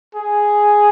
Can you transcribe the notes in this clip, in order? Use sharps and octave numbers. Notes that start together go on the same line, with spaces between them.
G#4